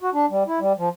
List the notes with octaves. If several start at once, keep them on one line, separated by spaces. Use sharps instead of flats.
F#4
D4
G3
E4
G3
F3